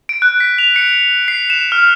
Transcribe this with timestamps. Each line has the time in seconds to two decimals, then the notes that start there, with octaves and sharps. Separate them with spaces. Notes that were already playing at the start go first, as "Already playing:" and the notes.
0.09 D7
0.22 F#6
0.40 B6
0.59 F7
0.76 C#7
1.28 C7
1.50 E7
1.72 F6